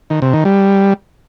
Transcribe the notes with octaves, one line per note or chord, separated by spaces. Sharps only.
D#3
C3
D#3
G3